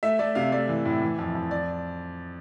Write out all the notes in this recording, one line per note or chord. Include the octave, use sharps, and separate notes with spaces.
A3 E5
A3 D5
C3 F5
A3 D5
E3
A2
E3
F2
F2
D5